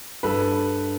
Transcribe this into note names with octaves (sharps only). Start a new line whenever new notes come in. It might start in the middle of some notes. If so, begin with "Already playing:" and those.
G2 A4 B4